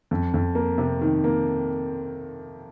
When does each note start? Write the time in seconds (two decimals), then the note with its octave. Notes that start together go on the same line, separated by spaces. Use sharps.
0.11 F2
0.34 F2
0.55 A#3
0.78 C3
1.01 D#3
1.24 A#3